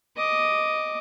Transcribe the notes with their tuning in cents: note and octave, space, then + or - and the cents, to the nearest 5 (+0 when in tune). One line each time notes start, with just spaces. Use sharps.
D#5 +0 D6 +0